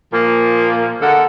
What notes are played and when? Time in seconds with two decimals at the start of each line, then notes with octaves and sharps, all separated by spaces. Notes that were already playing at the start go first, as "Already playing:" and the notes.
0.12 A#2 F3 A#3
1.00 D3 G#3 A4 A#4 F#5